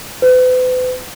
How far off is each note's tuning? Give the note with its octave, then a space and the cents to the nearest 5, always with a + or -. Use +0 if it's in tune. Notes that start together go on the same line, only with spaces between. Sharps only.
B4 +40